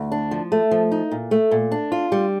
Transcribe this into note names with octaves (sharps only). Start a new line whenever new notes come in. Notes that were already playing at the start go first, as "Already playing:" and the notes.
Already playing: D2
D4
F3
A3
F3
D#4
A#2
A3
A#2
D4
F4
G3